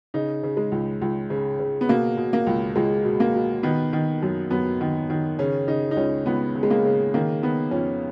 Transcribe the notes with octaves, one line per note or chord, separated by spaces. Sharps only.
C#3 D#4
C#3
G#3
C#2
C#2
C#3
C#3
B3
B2 A#3
B2
A#3
C#2
C#2 G#3
B2
A#3
B2
D#3 B3
D#3
F#2
F#2 B3
D#3
D#3
C#3 C#4
C#3 D#4
D#4
C#2 C#4
C#2 B3
C#3
G#3
A#3
C#3
D#3 A#3
D#3 B3
F2 C#4